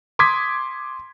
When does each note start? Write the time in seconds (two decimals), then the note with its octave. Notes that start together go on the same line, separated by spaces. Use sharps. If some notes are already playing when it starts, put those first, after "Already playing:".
0.19 C6 D6 D#6 G#6 B6